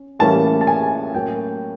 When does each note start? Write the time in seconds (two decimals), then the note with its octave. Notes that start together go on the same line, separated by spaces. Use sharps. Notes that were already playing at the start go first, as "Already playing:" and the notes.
Already playing: C#4
0.19 A2 E3 G3 A#3 C#4 A5
0.61 A5
0.67 G#5
1.14 A2 F#3 A#3 C#4 G5